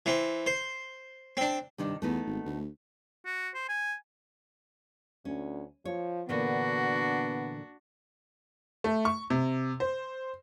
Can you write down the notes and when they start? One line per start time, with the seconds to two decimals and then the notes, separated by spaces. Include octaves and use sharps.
0.06 E3 C4
0.46 C5
1.37 C4 D4
1.78 G2 C3 D#3 D4
2.02 E2 A3 B3 D#4
2.26 G#1
2.45 D2
3.25 F#4
3.54 C5
3.69 G#5
5.25 D2 C#4
5.85 F3 C#5
6.29 A#2 D3 E3 B3 D4 F#4
8.84 A3
9.05 C#6
9.30 C3
9.80 C5